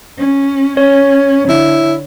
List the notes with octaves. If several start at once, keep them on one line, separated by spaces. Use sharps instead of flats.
C#4
C#4 C#5
D3 E4